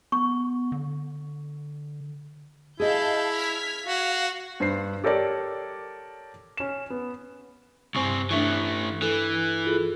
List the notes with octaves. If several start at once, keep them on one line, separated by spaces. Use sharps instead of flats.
B3 C#6
D3
E4 G#4 D#5 F5 A5 G6
F6 G#6 B6
F#4 F5
G2 C5 C7
G4 A4 A#4 C#5 D5
C#4 E7
B3
C2 G2 C4 G#5 C#6
E3 A3 D4 E5 C#6
E3 A4
F4 G#4 A4